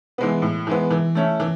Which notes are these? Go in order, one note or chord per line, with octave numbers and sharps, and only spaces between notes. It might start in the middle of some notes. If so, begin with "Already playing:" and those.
E3 G#3 B3
A2
E3 G#3 B3
E3
A3 C#4 E4
E3